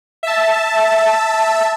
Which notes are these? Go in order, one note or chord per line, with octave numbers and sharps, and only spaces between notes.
E5 A5